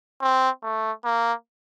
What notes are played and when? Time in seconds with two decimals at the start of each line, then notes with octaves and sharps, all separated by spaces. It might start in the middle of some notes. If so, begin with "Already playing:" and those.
0.21 C4
0.63 A3
1.04 A#3